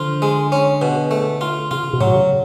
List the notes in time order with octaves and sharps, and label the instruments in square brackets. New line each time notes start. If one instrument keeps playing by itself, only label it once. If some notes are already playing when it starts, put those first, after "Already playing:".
Already playing: [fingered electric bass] D3 [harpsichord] F3 F4
[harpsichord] G#3
C#4
B2
A3
F4
[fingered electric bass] C#3 [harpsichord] F4
[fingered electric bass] B2
[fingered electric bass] A2 [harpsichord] F#3
[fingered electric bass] B2
C#3